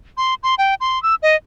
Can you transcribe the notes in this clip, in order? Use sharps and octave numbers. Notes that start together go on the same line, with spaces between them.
C6
C6
G5
C6
E6
D#5